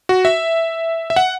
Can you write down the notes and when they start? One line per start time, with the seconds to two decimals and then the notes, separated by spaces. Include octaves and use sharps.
0.09 F#4
0.25 E5
1.10 E5
1.16 F#5